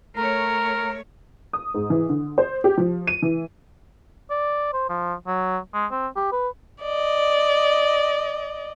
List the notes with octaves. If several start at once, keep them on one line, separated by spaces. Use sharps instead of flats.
A3 A#4 C#5 A#5
D#6
G#2
E3
D3
C5
G4
F3
D#7
E3
D5
C5
F3
F#3
G#3
C4
G4
B4
D5 D#5